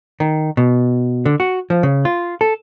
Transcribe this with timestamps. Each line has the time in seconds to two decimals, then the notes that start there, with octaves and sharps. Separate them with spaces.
0.20 D#3
0.57 B2
1.25 D3
1.40 F#4
1.70 F3
1.83 C#3
2.05 F4
2.41 A4